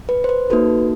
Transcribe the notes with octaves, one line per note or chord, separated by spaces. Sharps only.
B4
C5
B4
A#3 D#4 F#4 A4 B4